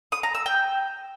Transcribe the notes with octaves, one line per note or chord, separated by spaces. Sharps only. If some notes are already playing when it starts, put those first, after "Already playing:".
D#6
A#5
E6
G5